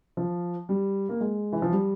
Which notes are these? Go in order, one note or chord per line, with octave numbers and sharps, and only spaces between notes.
F3
G3
A#3
G#3
E3
F3
G3